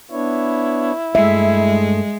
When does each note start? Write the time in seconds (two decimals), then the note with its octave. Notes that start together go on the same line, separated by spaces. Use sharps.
0.11 B3 D4 E4 C#5
1.15 G2 G#3 A3 E5